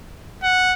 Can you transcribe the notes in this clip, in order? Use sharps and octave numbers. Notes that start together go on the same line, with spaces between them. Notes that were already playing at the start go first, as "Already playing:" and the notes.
F#5